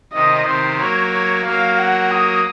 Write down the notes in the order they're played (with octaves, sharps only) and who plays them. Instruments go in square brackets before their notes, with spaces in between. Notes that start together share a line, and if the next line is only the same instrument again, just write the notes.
[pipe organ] C3 D#3 [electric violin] D#5
[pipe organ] C3 D#3 [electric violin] C5
[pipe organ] F#3 A#3 [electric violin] C#5
[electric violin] C#5
[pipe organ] F#3 A#3 [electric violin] F5
[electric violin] F#5
D#6